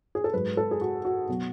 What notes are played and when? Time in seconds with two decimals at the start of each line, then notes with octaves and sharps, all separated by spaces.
0.15 G#4
0.24 A4
0.33 G#2 F#3 B4
0.57 A4
0.71 G#4
0.81 F#4
1.05 F#4
1.28 B2 F#3